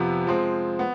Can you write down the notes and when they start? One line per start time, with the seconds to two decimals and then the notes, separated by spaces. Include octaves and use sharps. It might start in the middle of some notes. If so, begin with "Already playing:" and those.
Already playing: F2 C3 F3 B3
0.27 F3 G#3 C4
0.79 B3